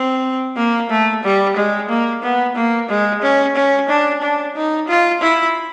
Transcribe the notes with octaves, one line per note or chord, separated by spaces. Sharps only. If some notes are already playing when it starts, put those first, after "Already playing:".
Already playing: C4
A#3
A3
G3
G#3
A#3
B3
A#3
G#3
C#4
C#4
D4
D4
D#4
F4
E4